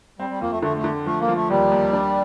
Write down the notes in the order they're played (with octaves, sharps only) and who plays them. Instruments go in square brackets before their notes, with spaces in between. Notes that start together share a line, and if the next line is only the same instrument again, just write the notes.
[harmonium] G3 [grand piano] C4
[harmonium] G3
[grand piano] F2 [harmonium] A#3
[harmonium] A3
[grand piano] D3 [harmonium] A3
[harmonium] A3
[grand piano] D3
[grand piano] F3 [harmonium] A3
[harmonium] A#3
[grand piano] F3
[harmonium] A3
[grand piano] D#2 [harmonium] G3
[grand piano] D#2
D4